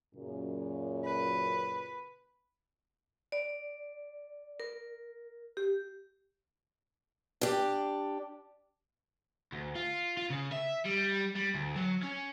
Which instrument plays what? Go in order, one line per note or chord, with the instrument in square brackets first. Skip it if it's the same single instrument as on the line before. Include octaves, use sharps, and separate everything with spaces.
[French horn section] F#2 A#2 C#3
[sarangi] B4
[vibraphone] D5
A#4
G4
[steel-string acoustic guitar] D4 G4
[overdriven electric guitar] D2
F4
F4
C#3
E5
G3
G3
D2
F#3
C#4